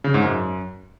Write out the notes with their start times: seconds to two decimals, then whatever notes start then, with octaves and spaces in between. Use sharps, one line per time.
0.04 C#3
0.14 G#2
0.24 F#2